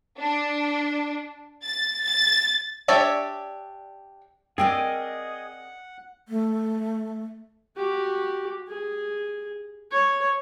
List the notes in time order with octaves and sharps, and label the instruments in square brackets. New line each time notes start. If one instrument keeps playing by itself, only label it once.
[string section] D4
A6
A6
[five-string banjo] D4 G4 C#5 D5 E5
[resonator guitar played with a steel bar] C4 A#4 D5 [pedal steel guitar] G#4 D#5 [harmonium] F#5 [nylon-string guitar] G5
[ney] A3
[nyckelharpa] F#4 G4
G#4
C#5